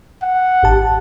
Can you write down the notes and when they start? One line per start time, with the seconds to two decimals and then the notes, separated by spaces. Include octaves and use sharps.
0.23 F#5
0.63 G#1 G4 A5